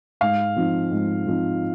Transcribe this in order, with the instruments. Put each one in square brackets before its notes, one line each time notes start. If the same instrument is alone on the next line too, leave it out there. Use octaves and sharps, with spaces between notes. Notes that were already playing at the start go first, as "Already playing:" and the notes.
[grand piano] G#2 F5
F3 C4 D#4
G#2
F3 C4 D#4